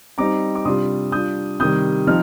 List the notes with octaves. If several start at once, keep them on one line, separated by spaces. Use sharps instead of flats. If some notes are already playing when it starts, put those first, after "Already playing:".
G3 C4 D#4 A#5 D6
D6
C3 G3 D4 F4 C6 D#6
G3 D4 F4 D#6 G6
C3 D#3 G3 D#6 G6
F3 C4 D#4 F6